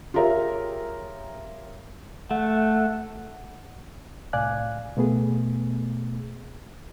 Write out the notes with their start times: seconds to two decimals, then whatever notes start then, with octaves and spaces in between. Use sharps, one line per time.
0.14 F4 G4 G#4 A#4 C#5 E5
2.31 A3 F#5
4.33 C2 A2 D5 F5 G#5 F#6
4.97 B2 A3 B3 G#4